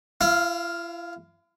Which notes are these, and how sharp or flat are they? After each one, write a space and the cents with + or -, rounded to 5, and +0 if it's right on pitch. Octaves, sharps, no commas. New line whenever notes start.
E4 +45 F5 +0